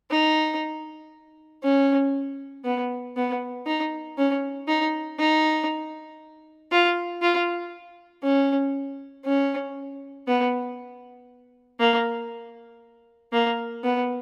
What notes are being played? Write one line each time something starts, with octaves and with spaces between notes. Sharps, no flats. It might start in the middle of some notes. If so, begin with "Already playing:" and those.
D#4
C#4
B3
B3
D#4
C#4
D#4
D#4
F4
F4
C#4
C#4
B3
A#3
A#3
B3